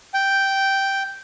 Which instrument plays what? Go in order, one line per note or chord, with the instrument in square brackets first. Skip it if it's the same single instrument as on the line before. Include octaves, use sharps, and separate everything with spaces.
[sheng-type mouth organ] G5